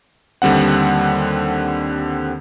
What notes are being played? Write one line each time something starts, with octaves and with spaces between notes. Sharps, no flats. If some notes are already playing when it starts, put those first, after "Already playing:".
D#2 D3 G3 C4 F#5